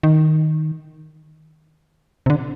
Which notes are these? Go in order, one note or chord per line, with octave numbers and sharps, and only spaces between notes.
D#3
C3
D3